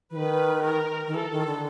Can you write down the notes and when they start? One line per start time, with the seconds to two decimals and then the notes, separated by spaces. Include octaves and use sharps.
0.11 E3
0.15 D#3 B4
0.65 A#4
1.07 D#3
1.14 E3 A4
1.32 D#3
1.47 D3